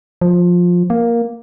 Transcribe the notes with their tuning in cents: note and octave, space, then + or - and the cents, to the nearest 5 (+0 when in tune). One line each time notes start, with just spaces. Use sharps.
F3 +15
A#3 +5